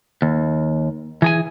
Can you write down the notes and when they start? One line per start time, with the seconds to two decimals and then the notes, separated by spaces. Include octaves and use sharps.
0.22 D#2
1.22 E3 G#4 G#5